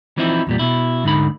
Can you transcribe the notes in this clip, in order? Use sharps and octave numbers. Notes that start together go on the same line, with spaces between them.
E3 F3 C4 D#4 E4
E2 A#2 G3
B2 E4
D2 G#2 D3 D#4 B5